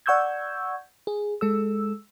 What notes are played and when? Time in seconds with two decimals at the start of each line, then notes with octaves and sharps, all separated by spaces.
0.06 D5 F#5 C#6 E6 G6 G#6
1.07 G#4
1.41 G#3 A4 E6